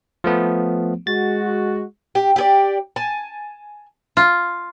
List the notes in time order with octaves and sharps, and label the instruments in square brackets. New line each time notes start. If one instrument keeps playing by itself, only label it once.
[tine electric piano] F3 A3 B3
[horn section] G#3 F#4 [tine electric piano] A6
[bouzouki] G4
G4 G#4 D5
G#5 A5
[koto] F4